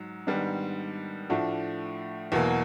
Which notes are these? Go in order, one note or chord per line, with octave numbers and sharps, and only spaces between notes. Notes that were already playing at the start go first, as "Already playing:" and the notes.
Already playing: G#2 F#3
G#2 D#3 G3 B3 D4
A2 F3 A3 D4 F#4
E2 B2 F#3 A#3